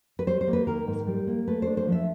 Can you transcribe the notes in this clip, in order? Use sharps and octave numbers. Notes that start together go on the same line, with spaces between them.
B4
G3 C5
C5
A#3
B4
D#3 A#4
G#2
G3
A#3
A3 B4
D4 C5
C5
F3
E5